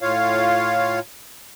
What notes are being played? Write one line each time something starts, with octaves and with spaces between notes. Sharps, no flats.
A2 F4 C#5 F5